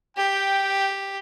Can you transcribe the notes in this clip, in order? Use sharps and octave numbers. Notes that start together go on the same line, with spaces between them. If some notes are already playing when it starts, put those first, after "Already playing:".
G4 G5